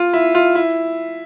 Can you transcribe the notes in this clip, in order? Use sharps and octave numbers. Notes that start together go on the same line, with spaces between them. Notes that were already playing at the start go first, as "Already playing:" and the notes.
Already playing: F4
E4
F4
E4